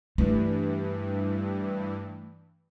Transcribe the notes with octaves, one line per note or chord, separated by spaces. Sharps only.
G2 E3 A3